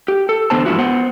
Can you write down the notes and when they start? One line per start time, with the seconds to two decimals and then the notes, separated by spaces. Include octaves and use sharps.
0.08 G4
0.29 A4
0.50 E2 D3 G3 B3 C5 A5
0.65 G#2 E3 F3 B3 E4 F#4
0.78 B3 C5 F#5